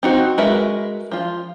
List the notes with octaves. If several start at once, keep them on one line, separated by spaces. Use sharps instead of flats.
C4 D#4 F#4 C5
G#3 F#4 A#4 B4 E5
F3 F4